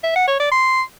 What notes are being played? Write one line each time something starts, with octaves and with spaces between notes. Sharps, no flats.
E5
F#5
C#5
D5
C6